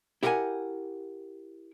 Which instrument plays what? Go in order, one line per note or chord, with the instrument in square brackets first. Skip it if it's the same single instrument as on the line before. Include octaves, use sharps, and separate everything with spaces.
[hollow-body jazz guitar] E4 G4 A#4 E5 F#5 G#5